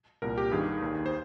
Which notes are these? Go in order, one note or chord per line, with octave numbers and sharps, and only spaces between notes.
C2 A#2 A#4
G4
G2 D#3 G#4
D#2 D#3
C5